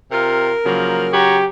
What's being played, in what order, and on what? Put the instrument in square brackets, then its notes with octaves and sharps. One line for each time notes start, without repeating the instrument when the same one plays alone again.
[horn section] C3 F4 [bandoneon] A#4
[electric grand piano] C#3 F#3 [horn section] F3 A#3
[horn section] F#4 C#5 A#5 [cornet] G4